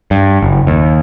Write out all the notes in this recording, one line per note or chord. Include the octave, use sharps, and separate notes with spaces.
G2
F#1
D#2